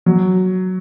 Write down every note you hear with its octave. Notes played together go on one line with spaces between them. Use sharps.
F#3